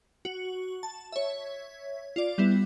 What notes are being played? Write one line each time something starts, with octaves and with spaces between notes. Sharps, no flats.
F#4
A5
C#5 E5
F4 D5
G3 B3 E4